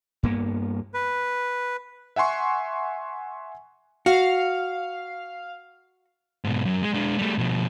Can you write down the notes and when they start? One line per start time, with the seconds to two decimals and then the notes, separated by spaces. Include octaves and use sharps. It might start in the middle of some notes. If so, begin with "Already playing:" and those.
0.23 G2 A#3 B3
0.94 B4
2.16 E5 F#5 G#5 C6 C#6
4.06 F#4 F5
6.44 G#2 B2
6.65 F#2
6.82 G#3
6.94 G#3 D4
7.19 G3 A3
7.38 B2 F3